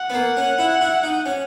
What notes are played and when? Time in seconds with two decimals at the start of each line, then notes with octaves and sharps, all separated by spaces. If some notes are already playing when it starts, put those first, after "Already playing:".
Already playing: F#5
0.10 B3
0.14 A#3
0.37 C#4
0.59 E4
0.81 E4
1.03 D#4
1.26 C#4